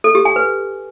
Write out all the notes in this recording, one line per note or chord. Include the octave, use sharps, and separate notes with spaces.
A4
G4
G#5
B4